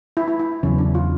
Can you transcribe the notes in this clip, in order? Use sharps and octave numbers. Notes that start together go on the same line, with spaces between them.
E4
E4
E4
E2 C#3 F#3 C#4
D4
F4